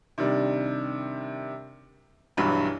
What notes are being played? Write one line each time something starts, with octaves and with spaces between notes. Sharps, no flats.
C3 D#3 G3 D4
B1 G2 E3 F#3 B5